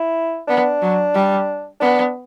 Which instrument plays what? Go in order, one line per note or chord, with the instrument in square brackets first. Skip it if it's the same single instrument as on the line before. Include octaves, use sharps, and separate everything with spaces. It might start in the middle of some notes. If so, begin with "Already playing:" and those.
Already playing: [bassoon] E4
[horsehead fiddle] B3 [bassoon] D4
[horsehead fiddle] F#3
G3
[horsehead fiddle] B3 [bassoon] D4